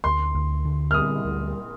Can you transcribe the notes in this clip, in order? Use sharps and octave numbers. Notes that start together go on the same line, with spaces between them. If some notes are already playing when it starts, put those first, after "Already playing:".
D2 C6
D2
D3
F6
G3 D#6
D2